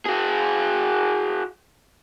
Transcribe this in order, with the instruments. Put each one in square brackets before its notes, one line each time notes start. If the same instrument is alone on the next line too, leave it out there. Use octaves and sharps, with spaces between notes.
[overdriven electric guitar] F#4 G#4